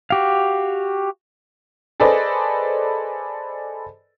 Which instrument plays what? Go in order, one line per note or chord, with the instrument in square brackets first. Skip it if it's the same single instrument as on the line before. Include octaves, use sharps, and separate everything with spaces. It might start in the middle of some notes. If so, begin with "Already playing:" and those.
[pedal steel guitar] F#4 G4 F5
[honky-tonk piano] G#4 A4 B4 C5 D5 D#5